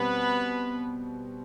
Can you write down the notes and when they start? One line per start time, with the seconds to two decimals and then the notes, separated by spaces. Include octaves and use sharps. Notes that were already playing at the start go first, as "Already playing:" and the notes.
Already playing: B2 G3 B3 C4 B4